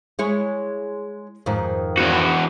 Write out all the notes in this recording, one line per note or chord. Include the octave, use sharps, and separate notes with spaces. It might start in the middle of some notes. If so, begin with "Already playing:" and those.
G#3 E4 C#5
F2 G#2 D#3
E2 F#4